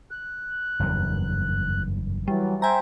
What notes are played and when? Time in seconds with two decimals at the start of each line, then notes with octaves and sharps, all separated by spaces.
0.11 F#6
0.79 F#1 E2 G2
2.28 E3 F#3 G3
2.62 C5 E5 G5 G#5 A#5